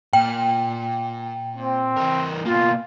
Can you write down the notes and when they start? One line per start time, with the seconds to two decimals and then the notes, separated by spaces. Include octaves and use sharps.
0.13 A#2 G5
1.55 C4
1.96 E3 A#4
2.46 B2 A#3 F4